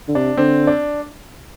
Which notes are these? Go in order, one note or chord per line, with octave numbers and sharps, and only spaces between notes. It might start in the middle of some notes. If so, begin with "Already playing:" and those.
D3
C3 D4
D3 C4
D4